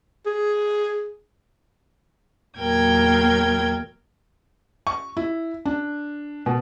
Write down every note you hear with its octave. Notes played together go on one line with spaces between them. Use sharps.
G#4
E2 A#2 F#3 A#4 G5 G#6
C#6
E4
D4
B2